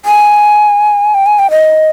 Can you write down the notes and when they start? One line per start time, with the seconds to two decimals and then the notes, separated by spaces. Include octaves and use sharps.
0.05 G#5
1.14 G5
1.26 G#5
1.39 G5
1.51 D#5